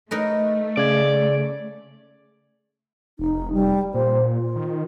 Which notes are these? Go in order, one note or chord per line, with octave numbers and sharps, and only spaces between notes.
A3 D#4 A#4 B4
C#3 D5 G#6
F1 D#4
G3
A#2 C5
F4
D#3